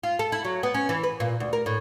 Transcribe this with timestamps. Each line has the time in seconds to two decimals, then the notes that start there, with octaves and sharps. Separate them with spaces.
0.03 F4
0.19 A4
0.32 E4
0.45 F#3
0.63 B3
0.74 C#4
0.89 E3
1.03 B4
1.20 A#2
1.40 D2
1.53 A#4
1.66 A2